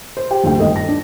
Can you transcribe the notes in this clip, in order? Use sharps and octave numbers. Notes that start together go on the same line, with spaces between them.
C5
G4 G5
F#1 D2 A3 G5
G#1 G2 A4 D#5
A#6
D4